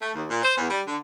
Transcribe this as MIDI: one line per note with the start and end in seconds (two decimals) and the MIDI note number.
0.01 0.12 57
0.15 0.24 39
0.30 0.42 46
0.43 0.57 72
0.57 0.68 40
0.69 0.82 55
0.88 0.97 50